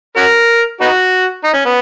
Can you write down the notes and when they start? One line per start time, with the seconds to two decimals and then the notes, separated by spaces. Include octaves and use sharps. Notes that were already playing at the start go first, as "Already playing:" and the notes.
0.17 C#4 F#4 A#4
0.81 B3 D#4 F#4
1.44 D#4
1.54 C#4
1.65 B3